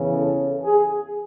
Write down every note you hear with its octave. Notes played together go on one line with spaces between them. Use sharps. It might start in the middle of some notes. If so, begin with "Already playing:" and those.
Already playing: E2 C#3 E3
A4
G#4